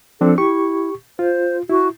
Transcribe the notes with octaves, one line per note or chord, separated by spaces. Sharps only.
F3 C4 D4 A4
E4 G4 C#6
F4 C5
E4 F#4